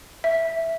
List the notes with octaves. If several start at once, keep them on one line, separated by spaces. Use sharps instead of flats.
E5